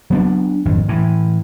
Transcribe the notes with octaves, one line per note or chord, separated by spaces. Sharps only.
F#3 B3 D4
G#1 F2
A2 E3